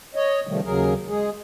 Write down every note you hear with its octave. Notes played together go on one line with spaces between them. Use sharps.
C#5 D#5
C3 D#3 F3 G3 A3
D#2 C#3 F#3 G#4 A#4
G#3 G#4